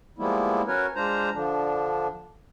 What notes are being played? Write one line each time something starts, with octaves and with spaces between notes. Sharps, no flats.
F3 G3 G#3 A#3 B3 E4
C#4 F#4 A#4 B4 C#5
G#3 D4 F4 C5 A#5
D3 F3 D4